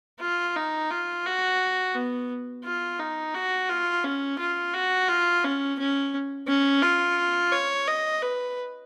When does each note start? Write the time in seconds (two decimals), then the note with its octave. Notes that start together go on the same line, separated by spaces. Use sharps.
0.20 F4
0.56 D#4
0.91 F4
1.26 F#4
1.95 B3
2.65 F4
2.99 D#4
3.34 F#4
3.69 F4
4.04 C#4
4.39 F4
4.74 F#4
5.08 F4
5.44 C#4
5.79 C#4
6.48 C#4
6.82 F4
7.52 C#5
7.87 D#5
8.22 B4